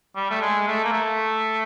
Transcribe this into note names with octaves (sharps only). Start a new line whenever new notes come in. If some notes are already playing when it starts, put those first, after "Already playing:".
G3
A3
G#3
A3
A#3
A3